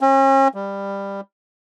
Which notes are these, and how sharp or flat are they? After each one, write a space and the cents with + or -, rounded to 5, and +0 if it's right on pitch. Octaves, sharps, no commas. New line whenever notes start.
C#4 -40
G3 +15